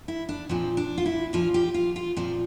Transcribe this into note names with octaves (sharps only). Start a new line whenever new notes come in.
E4
D4
A#2 F3 C4
D4
F4
E4
A#2 F3 F4
G4
F4
F4
A#2 F3 C4